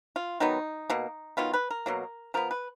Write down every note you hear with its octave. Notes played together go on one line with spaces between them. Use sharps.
F4
D#3 F#3 B3 D#4
B2 A#3
D#3 F#3 B3 F4
B4
A#4
B2 F#3 A#3
F3 B3 A#4
B4